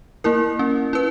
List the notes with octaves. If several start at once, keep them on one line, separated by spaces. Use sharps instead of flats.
A#3 E4 A#4
C#4
E4 B4